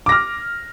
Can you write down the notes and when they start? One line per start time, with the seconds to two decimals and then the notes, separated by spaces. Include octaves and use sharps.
0.06 D6
0.09 A#6
0.12 F6